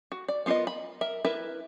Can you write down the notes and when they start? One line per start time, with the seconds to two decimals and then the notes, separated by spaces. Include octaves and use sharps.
0.12 F#4
0.28 D5
0.46 B3 F4 G#4 A#4 D#5
0.67 B5
1.01 A#4 E5
1.25 E4 A#4 B4 E5